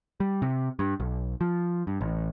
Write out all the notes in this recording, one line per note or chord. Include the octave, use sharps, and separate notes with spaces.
G3
C3
G2
B1
F3
G2
A1